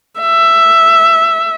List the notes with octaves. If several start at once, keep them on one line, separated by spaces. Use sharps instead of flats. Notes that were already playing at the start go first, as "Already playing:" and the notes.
E5